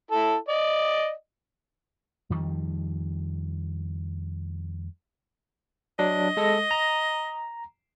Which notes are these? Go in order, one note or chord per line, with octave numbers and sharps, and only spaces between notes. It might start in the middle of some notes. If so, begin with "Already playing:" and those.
E4 A4
D5 D#5
F2 D#3 F3 G3
F#3 D4 D#5
G#3 A4 A#6
A#5